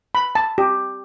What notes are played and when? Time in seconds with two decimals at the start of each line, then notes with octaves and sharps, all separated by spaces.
0.15 B5
0.35 A5
0.58 G4